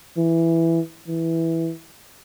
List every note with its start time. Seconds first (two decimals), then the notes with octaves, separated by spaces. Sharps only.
0.17 E3
1.08 E3